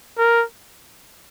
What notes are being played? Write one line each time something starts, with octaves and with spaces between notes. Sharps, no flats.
A#4